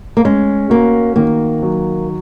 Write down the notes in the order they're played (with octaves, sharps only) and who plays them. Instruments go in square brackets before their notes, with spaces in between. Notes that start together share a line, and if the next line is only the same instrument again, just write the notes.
[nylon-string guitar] A#3
[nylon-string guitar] G#3 [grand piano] C#4
[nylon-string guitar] A#3 [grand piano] F#4
[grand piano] D#3 [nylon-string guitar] A#3
[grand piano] F#3